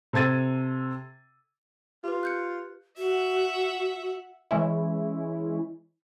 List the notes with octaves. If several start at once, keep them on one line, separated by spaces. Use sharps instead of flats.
C3 A4 G#6 A6 D#7
F4 G4 B4
F#6 G6 C#7
F#4 E5 F#5
E3 G#3 C#4 E4